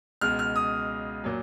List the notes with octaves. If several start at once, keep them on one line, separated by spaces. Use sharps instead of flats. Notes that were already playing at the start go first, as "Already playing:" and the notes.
C#2 B2 G#3 F6
F6
D#6
A#2 F#3